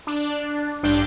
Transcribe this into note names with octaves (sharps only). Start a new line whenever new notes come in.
D4
A1 G2 D4 C6 D6 G6